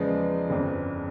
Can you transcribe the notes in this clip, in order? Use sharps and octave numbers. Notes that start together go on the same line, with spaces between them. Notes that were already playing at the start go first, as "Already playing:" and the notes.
Already playing: E2 C#3 F3 G#3 B3 D5
G1 F2 C#3